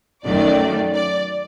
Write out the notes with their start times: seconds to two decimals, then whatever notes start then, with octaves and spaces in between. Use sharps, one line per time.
0.24 F#2 D#3 F#3 A3 D5
0.94 D5